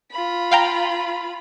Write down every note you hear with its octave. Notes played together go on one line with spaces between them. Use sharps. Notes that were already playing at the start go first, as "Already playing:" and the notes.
F4 B5
F5 G5 A#5